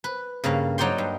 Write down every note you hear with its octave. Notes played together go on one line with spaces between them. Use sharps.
B4
G2 C#3 A#3 F5
F#3 D#4 D5 G5 C6
G2